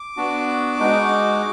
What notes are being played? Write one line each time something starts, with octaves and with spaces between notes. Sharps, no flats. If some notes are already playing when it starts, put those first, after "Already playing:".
Already playing: D6
B3 D4 F#4
G#3 D#4 F#4